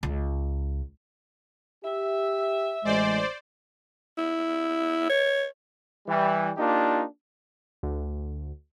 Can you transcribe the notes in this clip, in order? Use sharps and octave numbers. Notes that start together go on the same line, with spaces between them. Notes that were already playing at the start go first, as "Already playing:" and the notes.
C#2
G4 E5
A1 G#3 C5 D5
E4
C#5
E3 G3
A#3 D4 D#4 F4 G4
D2